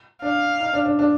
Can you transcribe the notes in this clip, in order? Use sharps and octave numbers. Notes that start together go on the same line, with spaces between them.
D4 F5
D#4
D4
D4
D4